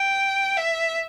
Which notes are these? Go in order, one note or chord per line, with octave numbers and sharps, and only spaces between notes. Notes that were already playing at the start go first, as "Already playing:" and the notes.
Already playing: G5
E5